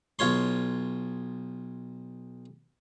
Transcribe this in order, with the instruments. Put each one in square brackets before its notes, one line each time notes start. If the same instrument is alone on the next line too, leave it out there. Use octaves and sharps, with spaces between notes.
[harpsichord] B1 F4 C#5 C6